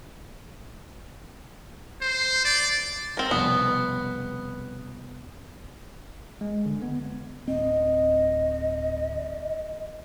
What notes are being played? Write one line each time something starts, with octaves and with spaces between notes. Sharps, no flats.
C5
D5
C4 A#4
C2 F2 B2 B3
G#3
D3
B3
D1 C4 D#5